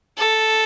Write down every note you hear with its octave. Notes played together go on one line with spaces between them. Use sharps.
A4